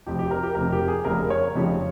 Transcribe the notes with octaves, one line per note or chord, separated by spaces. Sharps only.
F1 F2 C3 G4
G4
A#4
G4
F1 F2 C3 A#4
G4
G#4
F1 F2 C#3 G3 A#4
C#5
F1 F2 C#3 G3